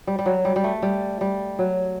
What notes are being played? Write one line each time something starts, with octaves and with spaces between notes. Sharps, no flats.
G3
G3
F#3
G3
G3
A3
G3
G3
F#3